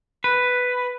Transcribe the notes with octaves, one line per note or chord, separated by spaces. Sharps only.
B4